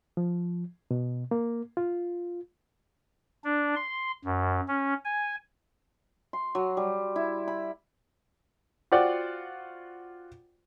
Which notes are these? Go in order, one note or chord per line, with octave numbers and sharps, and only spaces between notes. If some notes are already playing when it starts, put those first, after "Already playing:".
F3
B2
A#3
F4
D4
C6
F#2
C#4
G#5
C6
F#3
G3
E4
B5
F4 F#4 C5 D5 F#5 G5